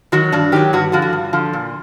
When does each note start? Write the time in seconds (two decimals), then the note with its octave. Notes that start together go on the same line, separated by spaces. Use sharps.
0.12 D#3 F#3 F#4
0.32 G2 D4
0.52 D#3 F#3 G4
0.73 G2 F#4
0.92 D3 F3 F#4
1.02 F#4
1.13 G2
1.33 D3 F3
1.53 A#2